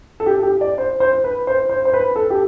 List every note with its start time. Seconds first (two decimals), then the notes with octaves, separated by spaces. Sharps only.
0.20 A4
0.26 G4
0.43 G4
0.61 D5
0.78 C5
1.00 C5
1.24 B4
1.47 C5
1.69 C5
1.85 C5
1.93 B4
2.16 A4
2.30 G4